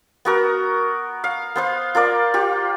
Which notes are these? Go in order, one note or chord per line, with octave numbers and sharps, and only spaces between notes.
B3 F#4 A#4
F5
B3 C5 F5
F4 A#4 D5
F4 G4